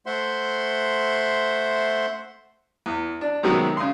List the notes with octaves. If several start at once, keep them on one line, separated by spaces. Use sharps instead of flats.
A3 C5 E5 F#5 C6
E2
D4
F#2 C3 D#3 F#3 G#3 B3
C#3 C6